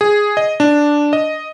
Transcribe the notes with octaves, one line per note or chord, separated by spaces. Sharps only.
G#4
D#5
D4
D#5